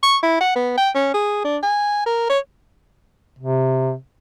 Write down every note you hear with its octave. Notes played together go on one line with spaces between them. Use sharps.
C#6
E4
F#5
B3
G5
C#4
G#4
D4
G#5
A#4
C#5
C3